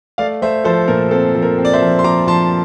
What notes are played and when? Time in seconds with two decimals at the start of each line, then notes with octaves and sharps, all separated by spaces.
0.18 A3 D5 F5
0.42 A3 C5 E5
0.64 F3 A4 C5
0.88 A#2 A#4
1.11 C4 A4
1.35 F3
1.42 A#4
1.58 C4
1.65 D5
1.73 C5 E5
1.82 F3
1.99 C6
2.04 F3 A#5 D6
2.27 F3 A5 C6